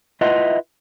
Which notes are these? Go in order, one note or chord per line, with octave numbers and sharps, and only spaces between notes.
E4 F4 B4 D#5 E5 F#5